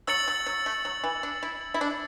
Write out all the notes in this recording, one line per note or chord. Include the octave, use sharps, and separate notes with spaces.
F#3 E6 A6 C#7 F#7
F#3
F#3
A3
F#3
E3
D4
E4
E4
D4